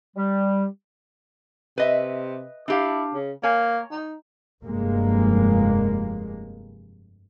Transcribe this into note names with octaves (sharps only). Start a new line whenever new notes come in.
G3
C3 B4 D#5 E5
D4 E4 G4 F5
C#3
A#3 C#5 G#5
D#4
F1 G2 G#3 A#3